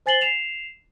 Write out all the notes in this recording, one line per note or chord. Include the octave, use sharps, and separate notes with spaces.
C5 G#5 A6 C7 F#7 G7
C7 E7 F7